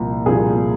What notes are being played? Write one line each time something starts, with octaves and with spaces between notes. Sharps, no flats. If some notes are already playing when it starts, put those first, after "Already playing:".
Already playing: C2 A#2 F3
C2 A#2 F3 G#4